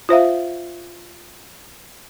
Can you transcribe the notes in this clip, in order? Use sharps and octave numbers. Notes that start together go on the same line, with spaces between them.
F4 C5 E5 F5